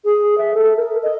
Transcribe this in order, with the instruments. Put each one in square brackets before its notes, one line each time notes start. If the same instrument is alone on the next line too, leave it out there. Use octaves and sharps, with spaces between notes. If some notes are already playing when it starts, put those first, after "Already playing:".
[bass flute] G#4
E5
A4
A#4
D#5